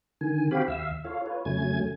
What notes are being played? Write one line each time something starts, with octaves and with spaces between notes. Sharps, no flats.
D3 D#3 G#5
C4 F#4 G4 F5 G5 B5
D#2 E5 F5 E6
F4 A4 C#5 F5
F4 B4 C#5
F2 C#3 F#3 A3 G#5 G#6